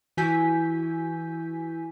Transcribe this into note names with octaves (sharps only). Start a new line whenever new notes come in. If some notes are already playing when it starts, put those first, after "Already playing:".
E3 E4 F#4 G#5 G6 B6